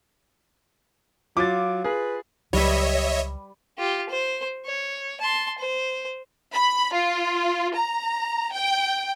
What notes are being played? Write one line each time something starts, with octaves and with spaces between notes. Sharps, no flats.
F#3 F4 D6 A6
G#4 B4
C#2 F#3 G3 B4 C#5 D#5 E5
F4 G4
C5
C#5
A5 C6
C5
B5
F4
A#5
G5